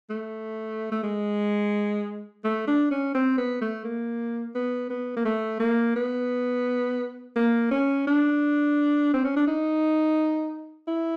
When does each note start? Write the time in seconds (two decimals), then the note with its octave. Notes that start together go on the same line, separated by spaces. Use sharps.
0.10 A3
0.92 A3
1.03 G#3
2.44 A3
2.67 D4
2.91 C#4
3.15 C4
3.38 B3
3.61 A3
3.84 A#3
4.55 B3
4.90 B3
5.17 A#3
5.25 A3
5.60 A#3
5.96 B3
7.36 A#3
7.71 C#4
8.07 D4
9.13 C4
9.24 C#4
9.36 D4
9.47 D#4
10.88 E4